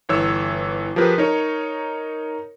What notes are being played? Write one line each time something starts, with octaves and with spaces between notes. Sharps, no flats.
G1 E3 C#5 E6
F3 G4 G#4 A#4 B4
D#4 A#4 C#5